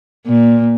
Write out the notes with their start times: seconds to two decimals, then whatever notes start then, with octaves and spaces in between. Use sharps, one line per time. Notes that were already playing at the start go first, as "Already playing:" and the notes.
0.27 A#2